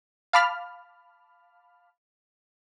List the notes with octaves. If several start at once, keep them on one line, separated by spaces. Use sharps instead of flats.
F5 A5 B5 D6 F6